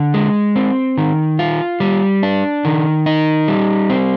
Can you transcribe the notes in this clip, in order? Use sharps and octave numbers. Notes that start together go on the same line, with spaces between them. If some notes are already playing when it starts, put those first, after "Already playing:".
Already playing: D3
G#3
C4
D#3
F4
G3
D4
D#3
D#4
G3
C4